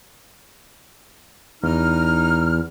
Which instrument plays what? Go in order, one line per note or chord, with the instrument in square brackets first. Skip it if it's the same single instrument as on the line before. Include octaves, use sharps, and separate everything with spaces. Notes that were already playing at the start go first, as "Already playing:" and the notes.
[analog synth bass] E2 [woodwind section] D#4 F6